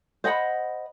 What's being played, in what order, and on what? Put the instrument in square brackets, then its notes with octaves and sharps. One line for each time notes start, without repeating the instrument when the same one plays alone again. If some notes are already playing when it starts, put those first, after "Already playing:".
[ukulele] C5 D#5 F#5 B5